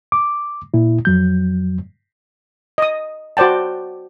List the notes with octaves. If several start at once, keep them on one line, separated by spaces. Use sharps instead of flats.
D6
A#2 E4
F2 F#3 G6
D#5 D#6
F#4 C5 D5 G5 A5